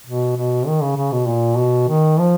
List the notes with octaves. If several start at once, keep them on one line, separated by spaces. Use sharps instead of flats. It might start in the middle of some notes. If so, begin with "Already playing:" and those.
B2
B2
D#3
C#3
C#3
B2
A#2
B2
D#3
F3